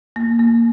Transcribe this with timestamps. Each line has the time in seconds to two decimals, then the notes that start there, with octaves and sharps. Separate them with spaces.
0.16 A#3
0.39 A#3